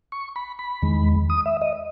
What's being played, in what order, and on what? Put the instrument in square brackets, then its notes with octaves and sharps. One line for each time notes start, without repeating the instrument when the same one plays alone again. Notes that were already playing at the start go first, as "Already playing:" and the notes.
[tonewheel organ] C#6
B5
B5
E2 D#3 G#3
D#6
E5
D#5